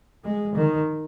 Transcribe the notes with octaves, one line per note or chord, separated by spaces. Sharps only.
G#3
D#3